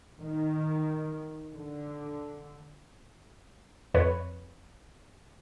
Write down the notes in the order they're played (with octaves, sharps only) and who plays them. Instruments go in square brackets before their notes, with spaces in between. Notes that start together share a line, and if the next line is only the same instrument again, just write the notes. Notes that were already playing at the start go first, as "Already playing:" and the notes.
[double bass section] D#3
D3
[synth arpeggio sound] F2 B4 C#5